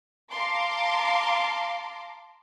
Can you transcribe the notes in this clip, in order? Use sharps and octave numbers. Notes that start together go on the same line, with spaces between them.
F5 A5 A#5 C6 D6